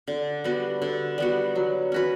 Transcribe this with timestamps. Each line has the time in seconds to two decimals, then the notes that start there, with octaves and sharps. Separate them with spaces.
0.08 D3
0.44 G3 B3 F#4
0.82 D3
1.18 G3 B3 F#4
1.55 F#3
1.92 C#4 F#4 B4